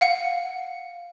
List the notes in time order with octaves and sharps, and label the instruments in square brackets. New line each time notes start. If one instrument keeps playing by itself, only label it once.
[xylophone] F5 F#5 C#7